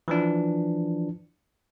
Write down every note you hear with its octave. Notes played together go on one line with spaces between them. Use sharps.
E3 F3 D4